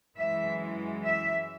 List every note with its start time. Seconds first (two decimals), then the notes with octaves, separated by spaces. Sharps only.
0.17 F#2 E3 G#3 E5
1.04 E5